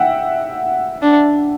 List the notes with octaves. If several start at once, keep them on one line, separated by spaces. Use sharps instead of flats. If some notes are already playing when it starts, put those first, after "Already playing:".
Already playing: E5 F#5 G5
D4